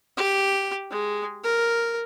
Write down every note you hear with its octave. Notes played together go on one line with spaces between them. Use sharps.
G4
G#3
A#4